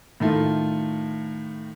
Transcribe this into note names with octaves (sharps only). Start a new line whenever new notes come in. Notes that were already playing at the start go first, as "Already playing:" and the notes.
A2 D#3 A3 F4